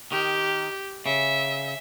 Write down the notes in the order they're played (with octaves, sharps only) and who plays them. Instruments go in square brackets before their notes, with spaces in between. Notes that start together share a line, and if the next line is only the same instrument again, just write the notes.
[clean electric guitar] D#3 [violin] G4
[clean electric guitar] C#3 [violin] E5